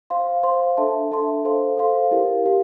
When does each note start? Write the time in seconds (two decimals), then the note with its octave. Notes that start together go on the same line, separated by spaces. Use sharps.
0.10 C5 F5 C6
0.43 C5 F5 C6
0.77 D4 A4 E5 A5 C6
1.11 D4 A4 E5 A5 C6
1.45 A4 C5 F5 C6
1.77 A4 C5 F5 C6
2.11 E4 G4 A#4 F5
2.45 E4 G4 A#4 F5